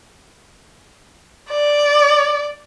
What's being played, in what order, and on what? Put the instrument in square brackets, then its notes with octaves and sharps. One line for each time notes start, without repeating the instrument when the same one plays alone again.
[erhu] D5